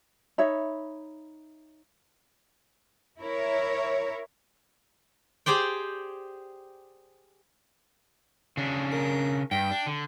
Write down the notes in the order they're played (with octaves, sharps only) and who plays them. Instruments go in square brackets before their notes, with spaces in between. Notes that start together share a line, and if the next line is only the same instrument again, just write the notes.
[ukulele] D#4 C#5 E5 B5
[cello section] E4 A#4 C#5
[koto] G4 G#4 C5 D5 G5
[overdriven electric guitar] C#3 D4
[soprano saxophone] A#4
[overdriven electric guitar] G2 [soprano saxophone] G5
[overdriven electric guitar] D4
D3